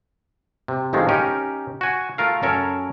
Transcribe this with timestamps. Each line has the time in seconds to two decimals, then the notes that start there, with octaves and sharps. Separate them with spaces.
0.68 C3
0.93 A1 C3 D#3 F3 G#3 A3
1.09 C#4 D#4 G4 A#4
1.81 F#4 G#5
2.18 A3 F4 A#4 F5
2.42 F#2 C#4 A4 A#4 C#5